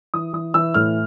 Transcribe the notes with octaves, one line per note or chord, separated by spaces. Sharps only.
E3 D#6
E3 D#6
E3 E6
A2 F6